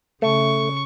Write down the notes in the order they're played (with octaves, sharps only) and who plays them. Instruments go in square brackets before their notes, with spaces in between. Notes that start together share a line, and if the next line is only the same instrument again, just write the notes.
[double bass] C#3 [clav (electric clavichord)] A3 [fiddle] C#6